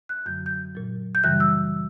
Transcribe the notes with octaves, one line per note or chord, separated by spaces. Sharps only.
F#6
F#2 D3 F#3 G6
G6
A#2 F#3
G6
F#2 C#3 E3 G3 F#6
E6